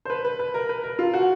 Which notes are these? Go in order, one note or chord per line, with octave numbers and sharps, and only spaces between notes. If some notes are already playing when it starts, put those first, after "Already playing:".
C5
B4
B4
B4
A#4
B4
A#4
F4
F#4